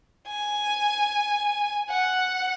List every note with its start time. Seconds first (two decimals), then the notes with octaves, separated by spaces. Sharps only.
0.28 G#5
1.90 F#5